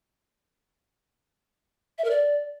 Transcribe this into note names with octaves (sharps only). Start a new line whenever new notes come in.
E5
A#4
D5